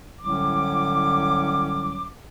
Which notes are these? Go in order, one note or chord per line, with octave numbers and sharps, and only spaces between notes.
C2 A2 D3 F#3 C#4 D6